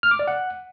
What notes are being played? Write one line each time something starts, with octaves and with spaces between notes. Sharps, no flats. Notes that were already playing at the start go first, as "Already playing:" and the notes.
F6
D6
D5
F#5